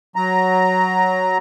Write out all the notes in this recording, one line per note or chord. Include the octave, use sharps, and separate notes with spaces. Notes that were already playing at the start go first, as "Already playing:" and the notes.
F#3 A#5